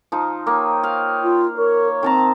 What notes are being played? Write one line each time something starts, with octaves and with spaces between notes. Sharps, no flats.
F3 D#4
A#3 C#5 G5 D#6
F5
F4
A#4 C#5
D#3 C4 A5 A#5